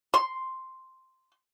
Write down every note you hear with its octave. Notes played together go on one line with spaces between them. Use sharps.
C6